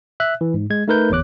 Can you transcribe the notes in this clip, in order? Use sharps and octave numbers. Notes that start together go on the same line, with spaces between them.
E5 F#6
E3
G#2
G#3 G#6
A3 D#4 A#4 B4 G6
G1 E2 C#5 D6 F#6